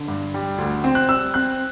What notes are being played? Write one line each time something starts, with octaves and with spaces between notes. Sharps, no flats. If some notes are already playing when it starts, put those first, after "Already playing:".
Already playing: D3
G2
G3
D2
C4
F#6
G3 E6
C4 F#6